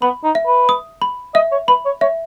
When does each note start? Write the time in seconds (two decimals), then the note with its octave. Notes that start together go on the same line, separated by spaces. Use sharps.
0.02 B3 B5
0.24 D#4
0.35 E5
0.47 B4
0.69 D#6
1.02 B5
1.34 D#5 E5
1.52 C#5
1.68 B4 B5
1.86 C#5
2.01 C#5 E5